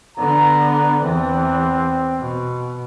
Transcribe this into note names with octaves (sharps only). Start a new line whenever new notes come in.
D3 B3 A#5
E2 E3 C4
B2